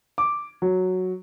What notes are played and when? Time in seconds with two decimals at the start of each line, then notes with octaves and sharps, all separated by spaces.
0.18 D6
0.62 F#3